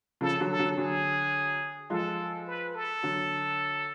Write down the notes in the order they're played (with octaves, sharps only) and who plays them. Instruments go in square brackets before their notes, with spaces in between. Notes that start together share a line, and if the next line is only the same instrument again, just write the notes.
[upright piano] C#3 F3 [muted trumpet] A4
[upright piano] D3 F#3
[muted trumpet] A4
[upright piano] D3 F#3
[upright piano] D3 F#3 [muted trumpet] G#4
[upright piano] F3 G#3 [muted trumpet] A4
[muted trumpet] B4
A4
[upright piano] D3 F#3